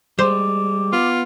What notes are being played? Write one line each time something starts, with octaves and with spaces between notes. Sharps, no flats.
G3 G#3 C5 D6
B3 F4